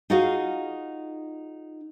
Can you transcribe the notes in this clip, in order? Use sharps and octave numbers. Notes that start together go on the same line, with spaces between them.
D#4 F4 F#4 G#4 F5